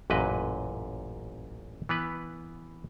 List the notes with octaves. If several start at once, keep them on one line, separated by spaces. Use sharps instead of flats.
A1 F#2 A#2 B4 D#5
E3 B3 B4